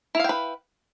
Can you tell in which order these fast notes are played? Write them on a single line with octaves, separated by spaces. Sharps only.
E4 F5 G5 B4